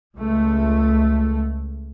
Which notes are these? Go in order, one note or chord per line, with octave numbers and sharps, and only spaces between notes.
C#2 A3